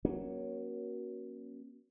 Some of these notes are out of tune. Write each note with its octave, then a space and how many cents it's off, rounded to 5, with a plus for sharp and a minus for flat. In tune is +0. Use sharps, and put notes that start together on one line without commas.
F#3 +5 A#3 +30 C#4 +0